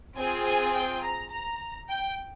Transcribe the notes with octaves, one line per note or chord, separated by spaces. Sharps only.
C4 F4 G#4 G#5
G#5
G5
A#5
A#5
G5